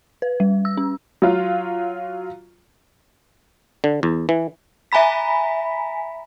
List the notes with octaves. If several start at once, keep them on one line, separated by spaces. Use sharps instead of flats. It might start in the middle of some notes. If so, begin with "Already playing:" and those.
B4
G3
E6
C#4
F#3 F4
D3
E2
E3
E5 G#5 A#5 B5 B6